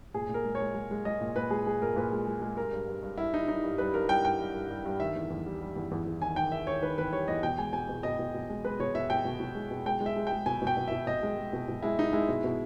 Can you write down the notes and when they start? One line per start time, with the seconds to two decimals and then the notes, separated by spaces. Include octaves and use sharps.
0.14 A#2 G#4
0.29 A#2 A#4
0.45 G#3
0.55 C#5
0.60 G#3
0.75 G#3
0.91 G#3
1.05 G#3 D#5
1.21 A#2
1.35 A#2 B4
1.50 G#3 G#4
1.66 G#3 G#4
1.82 A#2 A#4
1.96 A#2 B4
2.12 G#3
2.27 G#3
2.42 G#3
2.57 G2 A#4
2.73 G2
2.88 G2
3.03 G2
3.18 G3 E4
3.33 G3 D#4
3.48 G3 D#4
3.64 G2
3.78 G3 B4
3.94 G2 A#4
4.09 G2 G5
4.24 G3 G5
4.40 G2
4.55 G2
4.70 G3
4.86 G2
5.00 D#3 E5
5.16 E2
5.30 E2
5.46 G3
5.61 G3
5.76 E2
5.91 E2
6.06 E2
6.21 D#3 G#5
6.36 D#3 G5
6.52 D#3 E5
6.67 D#3 C#5
6.82 D#3 B4
6.98 E2 B4
7.12 G3 C#5
7.28 E2 D#5
7.43 B2 G5
7.58 G#3 G#5
7.73 B2 G#5
7.89 B2
8.03 B2 D#5
8.19 B2
8.34 B2
8.49 G#3
8.64 G#3 B4
8.79 B2 C#5
8.95 B2 E5
9.10 B2 G5
9.25 B2
9.40 B2
9.55 G#3
9.71 B2
9.86 G#3 G5
10.00 G#3
10.06 E5
10.16 G#3
10.27 G5
10.32 G#3
10.46 B2 G#5
10.62 B2
10.67 G5
10.77 B2
10.88 B2 E5
11.07 B2 D#5
11.23 G#3
11.37 G#3
11.53 B2
11.68 B2
11.82 G#3 E4
11.98 G#3 D#4
12.13 G#3 E4
12.29 B2
12.44 B2